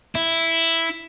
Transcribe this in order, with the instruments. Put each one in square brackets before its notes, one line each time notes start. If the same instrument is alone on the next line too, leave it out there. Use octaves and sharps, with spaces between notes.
[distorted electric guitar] E4